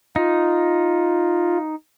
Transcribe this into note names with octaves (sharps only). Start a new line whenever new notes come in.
D#4 F4